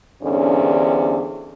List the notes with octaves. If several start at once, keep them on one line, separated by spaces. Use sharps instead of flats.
E2 G2 D3 C4 C#4